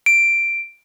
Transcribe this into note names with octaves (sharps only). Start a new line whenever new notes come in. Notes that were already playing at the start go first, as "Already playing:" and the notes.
D7